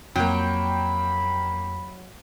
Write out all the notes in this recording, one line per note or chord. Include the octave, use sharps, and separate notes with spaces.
F2 F#3 A#3 G5 B5